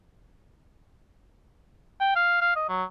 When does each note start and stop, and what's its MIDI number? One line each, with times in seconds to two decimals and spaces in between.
2.00 2.14 79
2.16 2.41 77
2.41 2.54 77
2.56 2.65 75
2.69 2.84 54